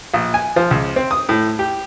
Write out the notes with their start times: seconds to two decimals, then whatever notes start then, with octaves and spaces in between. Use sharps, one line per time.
0.13 A#1
0.34 G#5
0.56 F3
0.71 C#2
0.96 C4
1.11 D#6
1.29 A2
1.59 G4